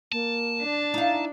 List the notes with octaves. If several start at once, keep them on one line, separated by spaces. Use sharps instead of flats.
A#3 A5
D4
D#4 E4 F5